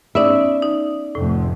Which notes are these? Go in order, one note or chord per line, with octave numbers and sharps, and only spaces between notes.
B3 C#4 D#4 D5 E5
D#4
F1 F2 A2